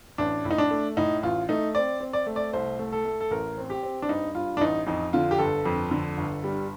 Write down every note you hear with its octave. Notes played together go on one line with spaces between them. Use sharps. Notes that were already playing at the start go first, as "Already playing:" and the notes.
A1 D4
A2
D#4
D4
A3
A2 D#4
A1 F4
A3 D#4
C4 D5
C4
D5
A3
D5
C2 C5
A3
A4
A3
A4
A1 A#4
C4
G4
C4
D4
G2 D#4
G2 F4
D4
A1 D#4
F2 D#4
D3 F4
G4
G1 A4
F2
D3
G1
G3